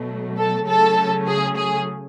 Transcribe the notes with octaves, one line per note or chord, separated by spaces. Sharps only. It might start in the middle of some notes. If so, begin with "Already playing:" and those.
Already playing: B2 F#3 A3
A4
C#3 F#3 A3 C#4 A4
G#4
G#4